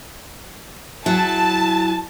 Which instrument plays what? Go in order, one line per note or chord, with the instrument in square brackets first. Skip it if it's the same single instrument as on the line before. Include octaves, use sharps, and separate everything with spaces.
[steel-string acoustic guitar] F#3 E4 G#4 [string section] A5